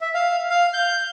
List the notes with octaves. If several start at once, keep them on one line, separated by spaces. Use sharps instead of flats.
E5
F5
F5
G6